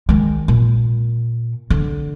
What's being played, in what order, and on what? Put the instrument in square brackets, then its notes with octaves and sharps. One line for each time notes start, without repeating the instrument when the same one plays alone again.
[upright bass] D#3 G#3
A#2
D3